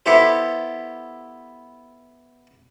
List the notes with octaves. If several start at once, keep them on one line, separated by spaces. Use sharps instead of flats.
B3 E4 G4 A4 C5